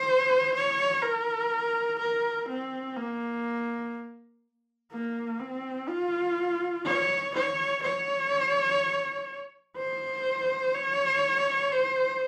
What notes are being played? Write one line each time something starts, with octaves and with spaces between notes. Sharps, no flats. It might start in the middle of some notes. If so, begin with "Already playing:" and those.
Already playing: C5
C#5
A#4
A#4
C4
A#3
A#3
C4
F4
C#5
C#5
C#5
C5
C#5
C5